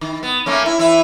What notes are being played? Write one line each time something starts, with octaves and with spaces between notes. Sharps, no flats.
D#3
B3
A3 A#3 C#4
E4
E3 E4